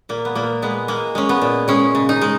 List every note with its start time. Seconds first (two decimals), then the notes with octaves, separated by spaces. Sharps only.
0.09 A#2 A#3
0.25 B3
0.35 A#2 A#3
0.62 G#3 B3
0.88 G#3 A#3
1.15 G#3 C#4
1.29 B3
1.41 A#2
1.68 G#3 C#4
1.95 C#3
2.09 D#4
2.21 G#3